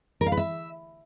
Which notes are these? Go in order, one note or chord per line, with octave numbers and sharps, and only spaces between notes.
A#4
F5
B4
E5